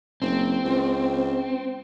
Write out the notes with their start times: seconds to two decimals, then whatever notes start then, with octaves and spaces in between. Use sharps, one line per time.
0.22 F#1 C4
0.65 C#2